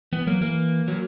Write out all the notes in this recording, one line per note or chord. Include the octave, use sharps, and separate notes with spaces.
E3 B3
F#3 A#3
E3 A#3
F#3